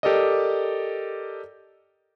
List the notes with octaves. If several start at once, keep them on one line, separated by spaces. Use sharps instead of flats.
G4 A4 A#4 D5 D#5